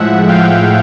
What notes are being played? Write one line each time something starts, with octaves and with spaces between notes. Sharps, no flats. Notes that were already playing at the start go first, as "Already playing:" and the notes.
Already playing: A2 F3 G#3 E5 F#5
F5 G5